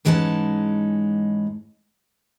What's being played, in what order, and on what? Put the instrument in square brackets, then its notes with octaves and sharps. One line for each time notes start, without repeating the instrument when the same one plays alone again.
[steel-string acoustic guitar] G#2 E3 G#3 C#4 D#4 A5